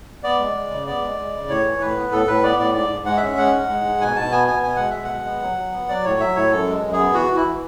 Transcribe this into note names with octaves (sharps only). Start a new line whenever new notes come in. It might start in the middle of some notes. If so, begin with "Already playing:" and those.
B3 D5
G#3
G#3
C#3
B3 D5
G#3
G#3
C#3
A2 C#5
E3
A2 B4
B3
A2 A4
A2 B4
B3 D5
A2 D5
G#2 D5
G#2
G#3 F#5
E5
C#4
G#3 F#5
G#2
G#3
G#2
B2 G#5
B2 A5
B3 G#5
B3 G#5
B2 G#5
G#3 F#5
B2 E5
F#5
G#3
B3
F#3
F#3
B3
F#3 D5
A2 C#5
F#3 E5
A2 C#5
F#2 A4
G#3
F#2
G#4
B3
E3 F#4
E3
E4
E3